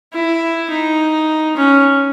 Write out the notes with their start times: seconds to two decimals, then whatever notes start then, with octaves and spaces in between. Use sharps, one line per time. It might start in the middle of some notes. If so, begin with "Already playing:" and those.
0.13 E4
0.70 D#4
1.56 C#4